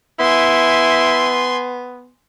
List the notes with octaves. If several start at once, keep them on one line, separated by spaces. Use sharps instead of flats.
B3 E4 G#5 C6